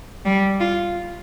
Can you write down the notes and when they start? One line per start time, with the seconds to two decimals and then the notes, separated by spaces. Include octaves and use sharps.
0.25 G3
0.60 F4